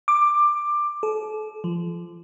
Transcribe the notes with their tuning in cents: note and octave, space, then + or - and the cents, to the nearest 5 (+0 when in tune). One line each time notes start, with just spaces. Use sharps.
D6 +15
A4 -35
F3 -25